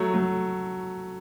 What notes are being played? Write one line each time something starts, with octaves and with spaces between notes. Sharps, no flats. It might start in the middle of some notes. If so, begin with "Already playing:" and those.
Already playing: F#3 A3
F#3 A3